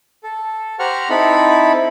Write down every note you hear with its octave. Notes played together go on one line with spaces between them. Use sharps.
A4
G4 C5 F#5 A#5 C#6 F6
C4 D#4 E4 A4 B5